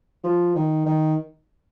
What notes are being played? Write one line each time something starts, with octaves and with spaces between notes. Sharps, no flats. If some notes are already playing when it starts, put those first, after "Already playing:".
F3
D#3
D#3